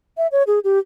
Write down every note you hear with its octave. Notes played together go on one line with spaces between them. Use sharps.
E5
C#5
G#4
G4